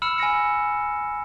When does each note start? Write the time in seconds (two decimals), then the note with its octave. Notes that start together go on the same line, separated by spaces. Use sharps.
0.02 B5 E6 F6 C#7 E7
0.18 G#5 E6 A#6 C#7